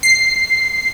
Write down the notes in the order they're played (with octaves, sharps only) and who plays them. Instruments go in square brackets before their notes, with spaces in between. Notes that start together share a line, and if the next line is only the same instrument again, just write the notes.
[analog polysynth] C7